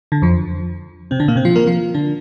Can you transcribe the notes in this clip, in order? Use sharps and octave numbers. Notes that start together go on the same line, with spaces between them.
D3
F2 F3
C3 C4
D3 D4
A#2 A#3
C3 C4
F3 F4
A#3 A#4
F3 F4
D3 D4